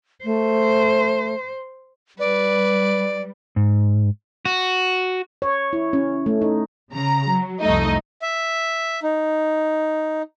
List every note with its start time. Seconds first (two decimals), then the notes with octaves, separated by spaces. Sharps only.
0.25 A3 C5
2.19 G3 B4 D5
3.56 G#2
4.46 F#4
5.42 C#5
5.73 E4
5.93 C#4
6.26 A3
6.42 D#4
6.92 C#3 A#5
7.28 F#3
7.62 C2 F2 G3 A3 D#4 D#5
8.22 E5
9.03 D#4